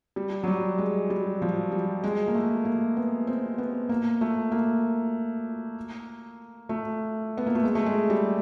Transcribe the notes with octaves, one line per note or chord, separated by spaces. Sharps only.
G3
F#3
G3
G#3
G3
F3
G3
G#3
A#3
A3
A#3
B3
C4
B3
A#3
A3
A#3
A3
B3
A#3
A3
G#3
A3
G#3
G3